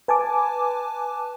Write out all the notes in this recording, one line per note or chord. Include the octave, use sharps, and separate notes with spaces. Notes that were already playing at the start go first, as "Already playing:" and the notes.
B4 G#5 A5 D6